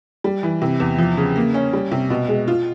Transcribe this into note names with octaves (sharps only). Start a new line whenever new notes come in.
G3
E3
C3
E2
F3
C#3
A#3
C#4
G3
C3
B2
G#3
F4